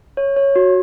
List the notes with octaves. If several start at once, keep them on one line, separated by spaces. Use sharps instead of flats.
C#5
C#5
F#4